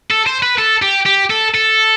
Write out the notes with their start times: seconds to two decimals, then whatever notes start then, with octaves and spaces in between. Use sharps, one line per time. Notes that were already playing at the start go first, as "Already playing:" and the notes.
0.10 A4
0.26 C5
0.42 B4
0.58 A4
0.82 G4
1.06 G4
1.30 A4
1.55 A4